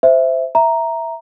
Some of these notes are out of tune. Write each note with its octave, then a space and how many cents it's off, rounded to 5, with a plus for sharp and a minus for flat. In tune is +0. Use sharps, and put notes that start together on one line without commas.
C5 -15 E5 +5
E5 +0 A#5 +0